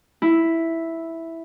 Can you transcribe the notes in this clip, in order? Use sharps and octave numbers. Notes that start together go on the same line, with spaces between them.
E4